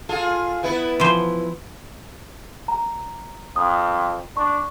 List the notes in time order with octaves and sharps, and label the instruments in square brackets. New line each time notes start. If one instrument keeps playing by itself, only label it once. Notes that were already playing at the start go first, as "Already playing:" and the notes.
[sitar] F4 G#4 A4
B3 E4 B4
[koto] E3 F3 C5
[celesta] A#5
[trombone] F2 [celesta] D#6
[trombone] D4 [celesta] C#6